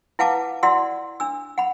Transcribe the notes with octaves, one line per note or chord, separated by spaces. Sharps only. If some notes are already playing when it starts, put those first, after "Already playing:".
E4 B4 F5 F#5 A5 D6
E4 F#4 D5 F#5 C6 E6
D4 E6
F#5 B5